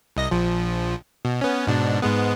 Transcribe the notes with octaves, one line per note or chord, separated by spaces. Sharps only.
C2 D#5 A#6
A#1 F3
B2
B3 C#4
G#2 B2 D4
G#2 G#3 B3